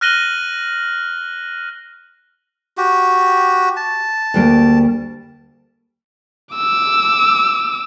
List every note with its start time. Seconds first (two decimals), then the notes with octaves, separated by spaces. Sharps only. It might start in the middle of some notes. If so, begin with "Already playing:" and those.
0.01 F6 F#6 A#6 D#7 F#7 G7
2.78 F#4 G4
3.77 A5
4.34 D2 G3 A#3
6.55 D6 E6